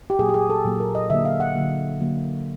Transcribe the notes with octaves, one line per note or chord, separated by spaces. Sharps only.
G4
A#2 F#3 A#3 G#4
G4
G#4
A4
A#2 F#3 A#3
A#4
D#5
D3 F#3 A#3 E5
F5
F#5
D3 F#3 A#3
D3 F#3 A#3